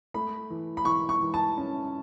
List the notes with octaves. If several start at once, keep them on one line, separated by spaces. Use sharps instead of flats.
A3 B5
E3
B5
E3 C#6
C#6
E3
A5
C#4